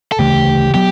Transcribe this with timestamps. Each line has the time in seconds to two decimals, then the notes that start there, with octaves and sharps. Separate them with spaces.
0.12 A4
0.19 D2 C#3 E3 A3 G4
0.74 F#3 B3 G4